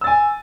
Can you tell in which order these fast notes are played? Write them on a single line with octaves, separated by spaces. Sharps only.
E6 A6 G#5